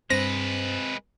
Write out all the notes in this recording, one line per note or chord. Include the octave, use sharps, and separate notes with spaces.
G2 G#3 C4 B4 C5 A#6